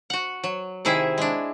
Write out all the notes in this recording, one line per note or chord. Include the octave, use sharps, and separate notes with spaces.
F#4 F#5
F#3
C3 D#3 E4 G#4 E5
G#3 D4